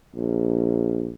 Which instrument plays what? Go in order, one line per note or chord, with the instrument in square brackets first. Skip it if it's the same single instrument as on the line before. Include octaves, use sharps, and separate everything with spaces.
[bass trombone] A#1